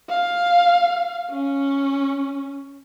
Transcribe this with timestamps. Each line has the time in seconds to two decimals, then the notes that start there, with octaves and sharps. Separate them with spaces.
0.10 F5
1.32 C#4